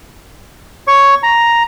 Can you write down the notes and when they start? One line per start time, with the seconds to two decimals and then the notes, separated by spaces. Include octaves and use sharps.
0.87 C#5 C#6
1.23 A#5